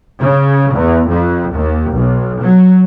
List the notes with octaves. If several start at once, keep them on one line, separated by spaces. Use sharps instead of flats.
C#3
E2
F2
D#2
B1
F#3